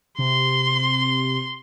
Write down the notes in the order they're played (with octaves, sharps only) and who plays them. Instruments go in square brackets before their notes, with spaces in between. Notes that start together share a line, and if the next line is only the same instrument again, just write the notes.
[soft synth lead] C3 [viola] C6